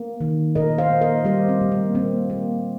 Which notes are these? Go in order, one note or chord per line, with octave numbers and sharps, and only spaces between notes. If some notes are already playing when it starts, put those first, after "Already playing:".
Already playing: A#3
D#3
A#2 A#4 D#5
C5 F5
A#3
A#4 D#5
G3 G4 C5
C4
A#2
A#3
A#3 C4
A#3